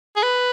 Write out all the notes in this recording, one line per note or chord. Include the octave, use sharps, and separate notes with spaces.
G#4
B4